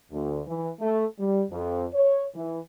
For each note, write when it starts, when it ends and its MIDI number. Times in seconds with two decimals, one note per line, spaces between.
0.11 0.40 38
0.46 0.70 52
0.80 1.04 57
1.19 1.43 55
1.50 1.84 41
1.93 2.24 73
2.34 2.58 52